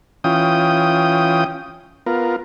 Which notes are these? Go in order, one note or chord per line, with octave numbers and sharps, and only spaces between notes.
E3 C#4 F4 G5 D#6
B3 F4 A#4